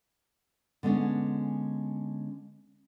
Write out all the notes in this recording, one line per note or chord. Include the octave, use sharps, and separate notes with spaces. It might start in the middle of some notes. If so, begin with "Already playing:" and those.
D3 G#3 B3 C#4 D4